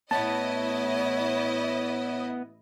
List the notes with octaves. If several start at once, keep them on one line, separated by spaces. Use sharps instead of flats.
A1 B3 E4 C#5 D#5 A5